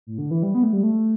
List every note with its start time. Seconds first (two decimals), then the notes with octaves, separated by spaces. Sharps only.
0.07 A2
0.18 D3
0.31 E3
0.43 G3
0.55 B3
0.63 A3
0.73 G3
0.83 A3